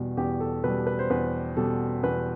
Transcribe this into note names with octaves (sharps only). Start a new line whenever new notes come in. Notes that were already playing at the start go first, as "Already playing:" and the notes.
Already playing: E2 B2 G3
E2 G4
A4
B2 G3 B4
B4
C5
E2 B4
B2 G3 A4
E2 B4